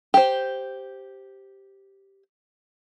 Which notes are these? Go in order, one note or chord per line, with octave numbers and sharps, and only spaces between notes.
G4 C5